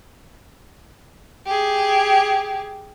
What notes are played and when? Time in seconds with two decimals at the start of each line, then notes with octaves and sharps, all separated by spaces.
1.46 G4 G#4